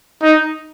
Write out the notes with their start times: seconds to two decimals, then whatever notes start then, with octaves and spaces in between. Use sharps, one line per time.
0.22 D#4